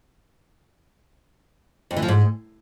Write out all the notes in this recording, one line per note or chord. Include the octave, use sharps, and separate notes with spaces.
F2
E3
F3
G#2